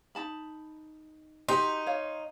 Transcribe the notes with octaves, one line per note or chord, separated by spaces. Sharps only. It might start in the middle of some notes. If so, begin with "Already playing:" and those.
D#4 A5 B5
D#4 F#4 G4 B4 C6
C#5 F5